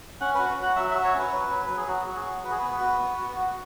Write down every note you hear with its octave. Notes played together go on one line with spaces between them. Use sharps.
C#4 F#5
F#4 B4
F#4
F#5
F#3 E5
F#4 E5
C#5
C#4 B4
F#3
F#3
F#3 B4
G#4
F#3 F#4
F#4
G#4
F#4
F#4 B4
G#4
B3 B4
F#4
B3
F#4
F#4